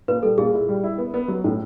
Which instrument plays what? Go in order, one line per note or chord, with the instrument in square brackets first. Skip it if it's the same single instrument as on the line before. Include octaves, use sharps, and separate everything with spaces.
[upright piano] A#2 [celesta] B4
[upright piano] G3 [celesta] A4
[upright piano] A#2 [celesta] G#4
[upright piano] E4
G3
E4
B3
B3
F#3
A2